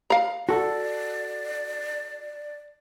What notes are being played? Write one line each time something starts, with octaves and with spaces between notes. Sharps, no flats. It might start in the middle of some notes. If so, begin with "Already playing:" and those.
F5 A#5
F#4 A4 D5